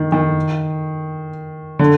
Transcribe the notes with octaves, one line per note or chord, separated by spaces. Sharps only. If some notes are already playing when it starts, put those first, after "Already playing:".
Already playing: D#3
D#3
D3